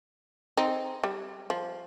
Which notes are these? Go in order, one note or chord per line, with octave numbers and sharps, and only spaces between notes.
C4 D#4
G3
F3